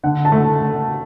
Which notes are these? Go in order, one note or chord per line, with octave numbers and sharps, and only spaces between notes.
D3 F#5
A5
A3